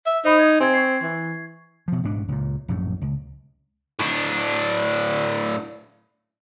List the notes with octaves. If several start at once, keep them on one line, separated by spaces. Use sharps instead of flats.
E5
D#4 C5 B5 D#6
G#6
C4 G#5 G#6
C#6 G#6 C7
E3
B2 F3
A1 G#2 B2 D4
C#2 A#2
A#1 F#2 A2
C#2
A2 D4